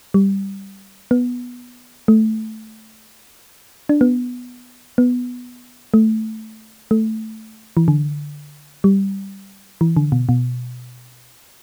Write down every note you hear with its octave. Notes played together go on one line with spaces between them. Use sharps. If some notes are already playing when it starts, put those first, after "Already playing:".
G3
B3
A3
D4
B3
B3
A3
A3
E3
D3
G3
E3
D3
B2
B2